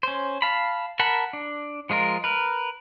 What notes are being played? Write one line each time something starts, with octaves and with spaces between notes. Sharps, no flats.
C#4 C5
F5 A5 B5
A#4 F#5 A5 B5
D4
F3 G#3 F4 A#4
A#4 B4